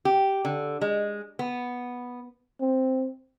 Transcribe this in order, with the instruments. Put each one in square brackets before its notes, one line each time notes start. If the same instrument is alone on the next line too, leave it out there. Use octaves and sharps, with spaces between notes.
[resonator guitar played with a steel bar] G4
D3
G#3
B3
[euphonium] C4